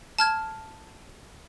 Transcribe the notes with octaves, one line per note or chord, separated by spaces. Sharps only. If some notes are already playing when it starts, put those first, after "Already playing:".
A5 F6 G#6